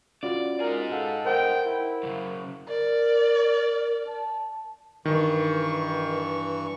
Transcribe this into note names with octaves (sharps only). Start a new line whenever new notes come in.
C#4 F4 F#4 D5
D#4 G#4 A#4
A4 F5 F#5
A#4 C5 F#5 G5
E4
F#2 C#3
A#4 D5
A5
G2 D#3 E3 C#6